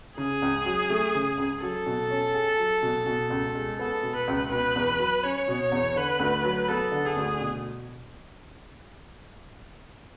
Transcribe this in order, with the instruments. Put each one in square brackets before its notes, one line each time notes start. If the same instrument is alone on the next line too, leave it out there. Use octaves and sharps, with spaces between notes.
[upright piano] C#3 [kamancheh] G#4
[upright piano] C#2
F#3
A3
C#3
C#2
[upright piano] F#3 [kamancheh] A4
[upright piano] B2
C#4
G#4
F#3
B2
B2
C#2
G#3
[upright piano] B3 [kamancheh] A4
[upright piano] B2
[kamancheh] B4
[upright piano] C#2
[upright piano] B2 [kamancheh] B4
[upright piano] E2
F#3
[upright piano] C#4 [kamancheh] C#5
[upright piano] B2
[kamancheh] C#5
[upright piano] E2
[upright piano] D3 [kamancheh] B4
[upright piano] D2
F#3
[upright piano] B3 [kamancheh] A4
[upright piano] D3
[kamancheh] G#4
[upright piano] D2
B2